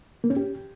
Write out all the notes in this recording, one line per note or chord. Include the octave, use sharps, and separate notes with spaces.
A#3
C#4
G4